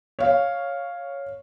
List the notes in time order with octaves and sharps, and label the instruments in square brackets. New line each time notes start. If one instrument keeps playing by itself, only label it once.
[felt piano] C#5 F5